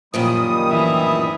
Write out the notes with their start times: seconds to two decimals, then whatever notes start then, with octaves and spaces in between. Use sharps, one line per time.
0.14 F#2 A#2 D#3 F3 G3 D#6
0.70 D2 A2 E3 E5